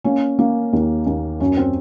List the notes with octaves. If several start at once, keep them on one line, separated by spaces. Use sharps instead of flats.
A#3 C#4
A#3
D#2
D#2
F#2 C#4
C4